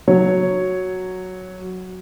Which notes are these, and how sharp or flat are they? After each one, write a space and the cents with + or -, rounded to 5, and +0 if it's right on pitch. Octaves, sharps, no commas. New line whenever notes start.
F#3 +0 C#5 +0